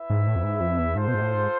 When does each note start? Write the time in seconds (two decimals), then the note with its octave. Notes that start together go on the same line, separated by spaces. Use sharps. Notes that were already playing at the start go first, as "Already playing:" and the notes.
Already playing: E4 B4 E5
0.10 G#2
0.27 A2
0.36 F2
0.44 G#2
0.61 F2
0.78 E2
0.95 G#2 F4 A4 C5
1.08 B2
1.14 G#2
1.21 A2
1.34 G#2